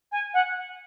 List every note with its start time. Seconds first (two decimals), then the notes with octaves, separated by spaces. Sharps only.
0.12 G#5
0.34 F#5